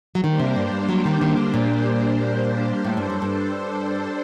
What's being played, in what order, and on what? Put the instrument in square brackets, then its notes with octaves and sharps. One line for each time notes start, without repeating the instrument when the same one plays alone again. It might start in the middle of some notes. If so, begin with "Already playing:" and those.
[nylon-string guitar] F#3
[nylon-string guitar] D#3 [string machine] G3 A#3 D4 G4 C5
[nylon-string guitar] C3
G2
G2
F#3
D#3
D#3
D3
A#2
[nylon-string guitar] A2 [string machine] G3 D4 A4 C5
[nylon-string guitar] G2
F#2
G2